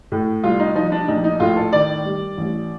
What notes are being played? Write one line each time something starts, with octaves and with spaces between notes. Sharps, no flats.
A2
C2 F4
D#4
F3 D#4
D4
A#1 D#4
D#4
A2 F4
A4
D#3 D5
G3
A1